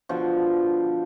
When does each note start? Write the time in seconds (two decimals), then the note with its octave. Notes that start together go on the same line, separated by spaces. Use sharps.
0.09 B2 D3 F3